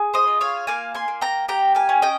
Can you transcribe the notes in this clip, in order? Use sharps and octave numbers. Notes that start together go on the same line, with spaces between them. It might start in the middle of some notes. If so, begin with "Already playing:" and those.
Already playing: G#4
C5 D#5
F4
C#5 F5
A#3 F5 G#5
G#5 C6
A#3
G5 A#5
G4 G5 A#5
F5 G#5
C#4
D#5 G5